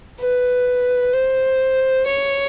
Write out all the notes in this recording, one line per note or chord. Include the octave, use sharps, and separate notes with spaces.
B4
C5
C#5